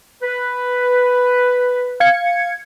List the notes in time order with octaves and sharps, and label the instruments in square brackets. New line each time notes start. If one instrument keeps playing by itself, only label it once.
[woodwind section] B4
[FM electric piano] F5 G#6 C#7